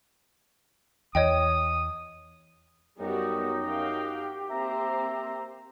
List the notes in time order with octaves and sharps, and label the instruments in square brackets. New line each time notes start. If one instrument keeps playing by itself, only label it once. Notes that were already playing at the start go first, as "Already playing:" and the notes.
[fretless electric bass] E2 [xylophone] C#5 D#5 G5 [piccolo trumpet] D#6
[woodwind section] F#2 D#4 [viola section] G3 B3 F#4 [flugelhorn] G4
[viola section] F#4 F5 G5
[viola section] A#3 C4 C5 [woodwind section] E5 A#5